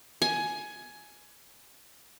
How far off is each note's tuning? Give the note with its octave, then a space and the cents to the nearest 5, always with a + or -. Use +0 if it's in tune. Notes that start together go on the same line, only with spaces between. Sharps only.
G#5 +15